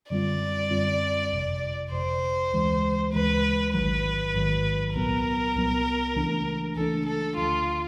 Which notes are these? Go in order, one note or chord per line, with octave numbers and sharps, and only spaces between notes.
F#2 D3 G3 C4 F4 D5
F#2 D3 G3 C4 F4
G1 F2 C3
G1 F2 C3 C5
D2 C#3 E3 G#3
D2 C#3 E3 G#3 B4
A1 G#2 D#3 F#3 B4
A1 G#2 D#3 F#3
C2 A#2 F#3 B3 A#4
C2 A#2 F#3 B3
C#2 C#3 E3 A3 D4
C#2 C#3 E3 A3 D4 A4
A4
D2 D3 F3 F4